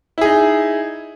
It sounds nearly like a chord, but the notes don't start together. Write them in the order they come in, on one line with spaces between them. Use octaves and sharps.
E4 G#4 D#4